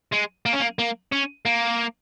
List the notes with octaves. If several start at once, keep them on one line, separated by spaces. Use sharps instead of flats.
G#3
A#3
C#4
A#3
A#3
C#4
A#3